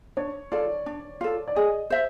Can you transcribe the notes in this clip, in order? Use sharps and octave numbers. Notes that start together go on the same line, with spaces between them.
D4 C#5
F4 A4 D5
D4
F4 A4
D5
G#4 D#5
C5 E5